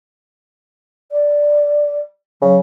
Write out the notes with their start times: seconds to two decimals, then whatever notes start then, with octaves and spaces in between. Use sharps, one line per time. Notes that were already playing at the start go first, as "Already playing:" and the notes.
1.11 D5
2.42 C#3 F#3